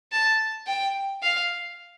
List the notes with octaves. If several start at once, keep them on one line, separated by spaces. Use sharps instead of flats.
A5
G5
F5